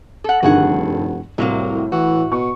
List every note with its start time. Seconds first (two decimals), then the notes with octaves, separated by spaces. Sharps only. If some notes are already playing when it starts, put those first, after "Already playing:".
0.24 A4 F#5
0.43 F1 G2 D3 D#3 F#4 G#4 F#5
1.38 C2 A2 C3 F#3 A#3
1.92 E3 F#4
2.32 B2 C#6